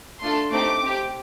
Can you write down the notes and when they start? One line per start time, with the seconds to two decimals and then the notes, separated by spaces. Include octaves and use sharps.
0.20 A3 D4 F4 A4 C6
0.51 A3 C4 D#4 G4 D6
0.81 C4 G4